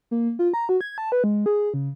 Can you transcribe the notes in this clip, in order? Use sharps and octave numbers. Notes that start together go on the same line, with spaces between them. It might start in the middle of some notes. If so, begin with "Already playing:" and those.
A#3
F4
A#5
F#4
G#6
A5
B4
G#3
G#4
C#3